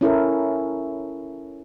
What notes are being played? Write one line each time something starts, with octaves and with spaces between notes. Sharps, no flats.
C#4 E4 A4 A#4